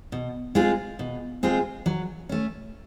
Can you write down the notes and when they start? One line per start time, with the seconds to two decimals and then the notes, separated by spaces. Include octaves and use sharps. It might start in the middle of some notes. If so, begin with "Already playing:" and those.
0.12 B2
0.55 G#3 C4 F4 G#4
0.99 B2
1.43 G#3 C4 F4 G#4
1.86 F#3
2.29 A3 C#4